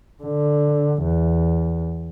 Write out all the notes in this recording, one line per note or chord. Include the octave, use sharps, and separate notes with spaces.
D3
E2